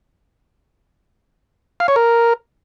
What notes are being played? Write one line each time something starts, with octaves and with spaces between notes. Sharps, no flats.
F5
C#5
A#4